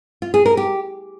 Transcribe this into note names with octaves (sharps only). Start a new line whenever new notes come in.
F4
G#4
A#4
G4